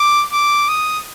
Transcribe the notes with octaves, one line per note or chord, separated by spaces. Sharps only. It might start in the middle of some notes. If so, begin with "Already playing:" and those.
Already playing: D6
D6
D#6